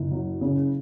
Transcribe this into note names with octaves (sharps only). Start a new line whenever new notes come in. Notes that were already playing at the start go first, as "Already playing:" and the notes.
Already playing: F#1
F#3
C#3